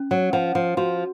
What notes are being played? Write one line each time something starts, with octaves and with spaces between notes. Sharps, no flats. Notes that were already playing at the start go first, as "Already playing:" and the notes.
Already playing: C#4
F#3
F3 F#5
F3
F3 F#4